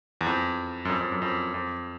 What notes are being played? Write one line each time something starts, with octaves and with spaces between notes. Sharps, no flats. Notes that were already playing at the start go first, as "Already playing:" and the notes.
E2
F2
F#2
F2
F2
F#2
F2
F2